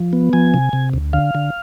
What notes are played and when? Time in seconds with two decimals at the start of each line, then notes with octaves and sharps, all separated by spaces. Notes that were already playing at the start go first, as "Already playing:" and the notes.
Already playing: F3
0.13 B3
0.33 F3 G#5
0.54 C3
0.73 C3
0.93 D2
1.13 D3 F5
1.35 D3